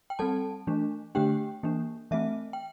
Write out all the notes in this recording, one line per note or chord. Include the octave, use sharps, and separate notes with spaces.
G5
G3 C4 A4 A5
E3 A3 D4
D3 A3 D4 G4 G5
E3 A#3 D4
E3 A3 C4 E5
G5